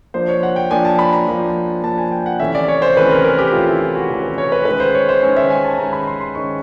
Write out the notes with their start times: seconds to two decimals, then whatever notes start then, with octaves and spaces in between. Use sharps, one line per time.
0.14 F3 A#3 D4 C5
0.28 C#5
0.43 F#5
0.56 G5
0.71 F3 A#3 D4 G#5
0.85 A5
0.99 B5
1.13 A#5
1.28 F3 A#3 D4
1.83 F3 A#3 D4 A5
1.98 G#5
2.12 G5
2.26 F#5
2.39 C3 E3 A3 C#4 E5
2.55 D5
2.68 C#5
2.82 C5
2.96 C3 E3 A3 C#4 B4
3.11 A#4
3.24 A#4
3.39 G4
3.53 C3 E3 A3 C#4 F4
3.67 E4
3.81 F4
3.95 F#4
4.10 C3 E3 A3 C#4 F#4
4.23 B4
4.38 C#5
4.52 B4
4.65 D#3 G#3 C#4 B4
4.80 C5
4.95 C#5
5.09 C5
5.23 D#3 G#3 C#4
5.37 E5
5.50 G#5
5.64 A5
5.79 D#3 G#3 C#4 A#5
5.93 B5
6.07 C6
6.21 C6
6.35 D#3 G#3 C#4 C#6